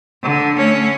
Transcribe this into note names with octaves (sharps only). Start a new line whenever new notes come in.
D3
A3 C#4